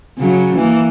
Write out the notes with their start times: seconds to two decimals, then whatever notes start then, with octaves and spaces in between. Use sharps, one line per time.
0.18 C#3 F#3
0.56 E3 A#3